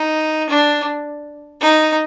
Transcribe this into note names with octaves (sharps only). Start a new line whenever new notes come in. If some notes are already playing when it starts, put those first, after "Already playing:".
Already playing: D#4
D4
D#4